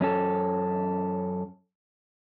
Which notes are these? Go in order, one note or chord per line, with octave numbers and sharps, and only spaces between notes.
F#2 C#4 A4